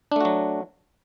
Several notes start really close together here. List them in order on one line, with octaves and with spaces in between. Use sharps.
D4 A3 F#4 F#3